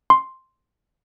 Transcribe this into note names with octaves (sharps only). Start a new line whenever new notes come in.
C6